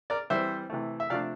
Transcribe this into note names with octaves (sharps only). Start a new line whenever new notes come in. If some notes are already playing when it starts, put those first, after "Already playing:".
A#4 D5
E3 G3 C4 C5 E5
C3 E3 A3
E5
C3 F3 A3 D4 D5 F5